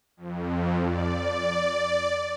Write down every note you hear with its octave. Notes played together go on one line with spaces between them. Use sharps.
F2
D5